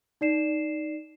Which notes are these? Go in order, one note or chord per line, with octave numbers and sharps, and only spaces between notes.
D#4 D5 C7 E7